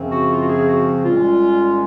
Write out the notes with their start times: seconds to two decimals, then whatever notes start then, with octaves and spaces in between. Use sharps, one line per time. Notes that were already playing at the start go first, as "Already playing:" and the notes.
Already playing: F#2 C#3 F3 C4
0.11 F#4
0.30 F4
0.41 F#4
0.48 G#4
0.67 F#4
1.04 C2 A#2 G#3 C#4 F4